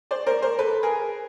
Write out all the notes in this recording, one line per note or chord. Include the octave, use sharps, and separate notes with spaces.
C5 D5
A#4 C5
A#4 C5
A4 B4
G#4 A#4